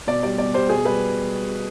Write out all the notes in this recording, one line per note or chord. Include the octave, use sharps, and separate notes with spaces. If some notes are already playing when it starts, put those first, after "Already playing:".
B2 D5
G3 D5
B2 D5
G3 C5
B2 G#4
G3 B4